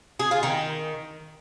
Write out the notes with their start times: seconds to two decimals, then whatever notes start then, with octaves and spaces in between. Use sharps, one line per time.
0.19 G#4
0.31 F4
0.43 D#3